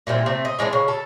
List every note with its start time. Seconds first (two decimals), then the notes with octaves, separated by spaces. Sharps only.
0.07 A#2 E3 G3 C4
0.26 C3 A3 C4
0.45 D#5
0.59 E3 G#3 C4 D4
0.73 C#3
0.88 A4